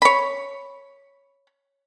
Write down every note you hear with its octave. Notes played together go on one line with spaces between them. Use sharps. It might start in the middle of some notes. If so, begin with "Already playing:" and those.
C#5 B5